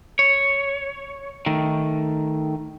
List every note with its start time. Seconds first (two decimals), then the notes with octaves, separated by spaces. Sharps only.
0.19 C#5
1.46 D#3 A3